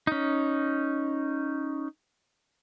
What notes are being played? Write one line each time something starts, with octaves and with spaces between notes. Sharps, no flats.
C#4 D#4